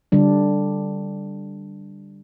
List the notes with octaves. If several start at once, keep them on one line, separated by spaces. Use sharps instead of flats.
D3 G3 D4